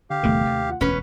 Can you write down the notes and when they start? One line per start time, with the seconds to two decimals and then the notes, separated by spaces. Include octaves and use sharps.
0.10 D3 G4 F5
0.23 G1 E2 C3 D#3 A3
0.45 D#2
0.70 F4 F#5
0.81 E1 D2 C#4 B4